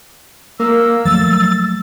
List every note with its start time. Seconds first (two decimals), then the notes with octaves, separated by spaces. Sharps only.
0.59 A#3 E6
1.05 F3 F#3 A3 A6